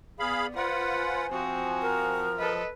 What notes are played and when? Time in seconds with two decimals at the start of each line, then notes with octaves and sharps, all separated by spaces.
0.20 B3 G#4 D5 F5 B5
0.55 F4 B4 C5 F#5
0.97 G#5
1.29 F3 C4 F#4
1.82 A#4
2.39 A4 B4 D#5